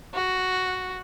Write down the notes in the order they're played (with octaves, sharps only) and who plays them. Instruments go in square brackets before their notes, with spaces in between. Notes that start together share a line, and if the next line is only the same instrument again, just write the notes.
[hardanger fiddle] F#4